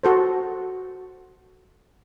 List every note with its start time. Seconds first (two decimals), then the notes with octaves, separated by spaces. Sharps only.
0.03 F#4 A4 C5